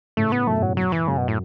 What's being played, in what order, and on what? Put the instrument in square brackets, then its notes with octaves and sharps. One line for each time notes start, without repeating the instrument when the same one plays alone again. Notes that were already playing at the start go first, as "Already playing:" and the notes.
[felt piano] A2 C#3 [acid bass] A3
[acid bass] B3
[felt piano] F#2 B2 [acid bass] A3
[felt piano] A2 [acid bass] F#3
[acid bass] F#3
E3
[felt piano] F#2 [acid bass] C#3
[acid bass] B2
A2